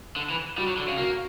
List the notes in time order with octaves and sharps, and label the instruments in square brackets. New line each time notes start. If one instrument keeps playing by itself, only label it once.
[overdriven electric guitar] D3
E3
[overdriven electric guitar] G3 [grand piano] F#4
[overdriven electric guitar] F#3
D3
C#3
[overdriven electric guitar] A#3 [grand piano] F#4